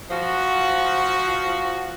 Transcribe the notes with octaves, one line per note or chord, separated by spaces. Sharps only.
F3 F#4